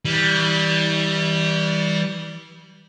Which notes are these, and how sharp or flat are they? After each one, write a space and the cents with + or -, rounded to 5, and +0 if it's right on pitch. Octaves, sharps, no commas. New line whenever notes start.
E3 -35 G3 -5